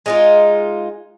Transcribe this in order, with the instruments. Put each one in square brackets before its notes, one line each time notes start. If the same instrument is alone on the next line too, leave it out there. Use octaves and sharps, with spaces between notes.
[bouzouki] G#3 D#4 F4